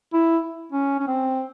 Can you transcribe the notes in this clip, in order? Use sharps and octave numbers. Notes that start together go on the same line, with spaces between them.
E4
C#4
C#4
C4